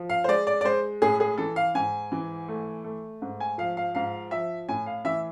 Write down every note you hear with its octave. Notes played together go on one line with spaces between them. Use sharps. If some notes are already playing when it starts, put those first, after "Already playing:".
Already playing: F3
F5
C5
G#3 D5
D5
D5
G#3 C5
A2 G#4
G#4
E3 A4
F5
G#2 G#5
E3
A3
A3
G#2
G#5
F3 F5
F5
G#2 F5
F3 E5
A2 G#5
F5
E3 E5